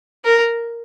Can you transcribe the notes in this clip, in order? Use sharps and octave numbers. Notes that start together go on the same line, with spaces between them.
A#4